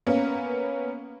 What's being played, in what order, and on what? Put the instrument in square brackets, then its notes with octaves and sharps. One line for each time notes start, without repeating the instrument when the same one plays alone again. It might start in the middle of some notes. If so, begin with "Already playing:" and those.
[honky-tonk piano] A#3 B3 C#4